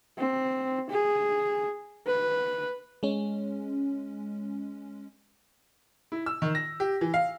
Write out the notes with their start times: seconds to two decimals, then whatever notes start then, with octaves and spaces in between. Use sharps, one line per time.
0.18 C4
0.90 G#4
2.07 B4
3.03 G#3 C#4
6.12 E4
6.26 E6
6.42 D#3
6.55 A#6
6.80 G4
7.01 E3
7.14 F5